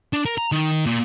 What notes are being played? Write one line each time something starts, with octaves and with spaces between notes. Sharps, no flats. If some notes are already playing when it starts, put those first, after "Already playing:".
D4
A#4
A#5
D#3
A#2